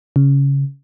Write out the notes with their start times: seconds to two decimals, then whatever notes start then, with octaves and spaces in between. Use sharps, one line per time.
0.16 C#3